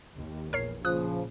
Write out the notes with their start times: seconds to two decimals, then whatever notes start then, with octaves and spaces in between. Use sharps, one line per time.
0.16 D#2
0.53 A#1 E2 A#4 C#5 C7
0.85 A#2 C#3 F3 D#6 F#6